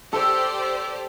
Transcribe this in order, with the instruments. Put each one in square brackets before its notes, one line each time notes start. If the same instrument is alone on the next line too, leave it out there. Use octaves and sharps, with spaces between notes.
[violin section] G4 C5 D5 [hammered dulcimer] A4